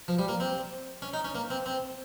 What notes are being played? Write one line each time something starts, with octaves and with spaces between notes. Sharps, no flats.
F3
G3
A#3
C4
C#4
D#4
C#4
A#3
C4
C4